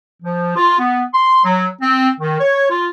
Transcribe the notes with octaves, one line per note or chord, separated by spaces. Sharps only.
F3
F4
B3
C6
F#3
C4
D#3
C#5
F4